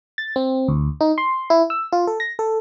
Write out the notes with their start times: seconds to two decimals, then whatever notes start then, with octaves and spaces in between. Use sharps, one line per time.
0.18 A6
0.36 C4
0.68 D2
1.01 D#4
1.18 C6
1.50 E4
1.70 E6
1.92 F4
2.07 A4
2.20 A#6
2.39 A4